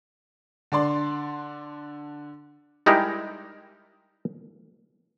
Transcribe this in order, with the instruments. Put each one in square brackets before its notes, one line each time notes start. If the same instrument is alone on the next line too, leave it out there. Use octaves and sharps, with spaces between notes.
[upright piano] D3 D4 D5 C6
[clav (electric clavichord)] G3 G#3 D#4 E4 G4 A#4